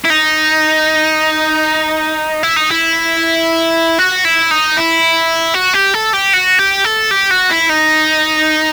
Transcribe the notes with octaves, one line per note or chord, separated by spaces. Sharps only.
E4
D#4
E4
D#4
E4
F#4
E4
D#4
E4
F#4
G4
A4
G4
F#4
G4
A4
G4
F#4
E4
D#4